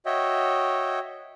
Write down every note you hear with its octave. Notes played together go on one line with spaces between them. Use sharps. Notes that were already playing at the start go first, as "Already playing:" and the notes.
F#4 C#5 D#5 E5 G5